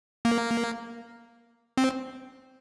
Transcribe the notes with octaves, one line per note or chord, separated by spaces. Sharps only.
A#3
C4